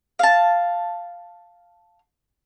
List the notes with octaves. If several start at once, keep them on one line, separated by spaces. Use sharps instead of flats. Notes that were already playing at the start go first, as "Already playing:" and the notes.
F5 A5